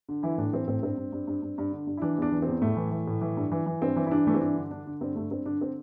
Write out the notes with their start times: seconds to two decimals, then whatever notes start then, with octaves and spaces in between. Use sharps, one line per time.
0.09 D3
0.23 E3 E4
0.38 A2 D4
0.53 E3 C4
0.68 A2 C4
0.83 G2 C4
0.97 G2
1.12 G2
1.27 G2
1.42 G2
1.58 G2
1.72 D3
1.87 G2
1.97 E4
2.02 E3 D4
2.18 E2 D4
2.32 E3
2.42 E2 C4
2.62 A2 A3
2.77 E3
2.91 E3
3.07 A2
3.21 E3
3.37 G2
3.52 E3
3.66 E3
3.82 G2 C4
3.96 E3
4.07 E4
4.11 G2 D4
4.27 E3 A3
4.34 C4
4.41 G2 D4
4.56 D3
4.71 D3 D4
4.87 D3
5.01 G2 C4
5.15 G2 A3
5.31 G2 C4
5.46 D3 D4
5.61 C4